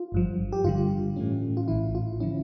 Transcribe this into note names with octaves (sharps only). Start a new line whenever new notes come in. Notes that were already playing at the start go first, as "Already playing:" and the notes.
Already playing: F4
G1 G2 F3
G4
G2 D3 G3 F4
A2 E3 A3 C#4
F4
A#1 A2 E3 E4
F4
D3 F3 C#4 E4